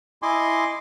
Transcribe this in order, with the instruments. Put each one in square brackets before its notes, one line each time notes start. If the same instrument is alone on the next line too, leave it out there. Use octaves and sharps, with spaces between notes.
[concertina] E4 D#5 G#5 C6 D6